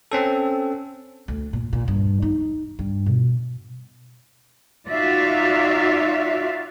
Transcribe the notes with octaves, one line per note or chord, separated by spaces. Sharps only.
C4 C#4 A4
D2
A#2
A#2
G2
D#4
G2
B2
D#4 F4 F#4 D5 E5 F5